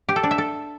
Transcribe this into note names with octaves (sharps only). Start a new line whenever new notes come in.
G4
A4
D4
E5
A4